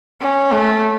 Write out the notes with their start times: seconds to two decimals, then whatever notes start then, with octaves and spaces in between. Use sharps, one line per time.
0.21 C#4
0.52 A3